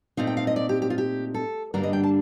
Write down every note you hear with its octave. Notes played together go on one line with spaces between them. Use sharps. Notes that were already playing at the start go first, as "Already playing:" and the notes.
A#2 A3 C4 D#4 F5
G5
F5
D#5
D5
G4
G4
F4
G4
A4
G2 D3 G3 A#3 D4 A#4
D#5
G5
A5